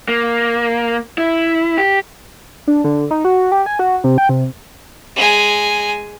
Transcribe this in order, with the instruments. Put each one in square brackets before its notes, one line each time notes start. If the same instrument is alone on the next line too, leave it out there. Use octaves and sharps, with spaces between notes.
[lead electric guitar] A#3
E4
G4
[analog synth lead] D4
D3
D#4
F#4
G4
G#5
F#4
C3
G5
C3
[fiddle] G#3 G#5